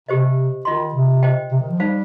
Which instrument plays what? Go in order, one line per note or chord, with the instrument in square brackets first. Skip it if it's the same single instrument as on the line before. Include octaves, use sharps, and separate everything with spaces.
[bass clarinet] C3 [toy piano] G4 C5 D#5
[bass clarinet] D#3 [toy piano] F4 D#5 C6
[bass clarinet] C3
[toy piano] C5 D#5 G5
[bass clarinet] C3
D#3
F3
[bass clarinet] G3 [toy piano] D#4 C5 F5